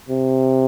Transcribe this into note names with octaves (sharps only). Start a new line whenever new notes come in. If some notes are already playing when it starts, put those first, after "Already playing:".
C3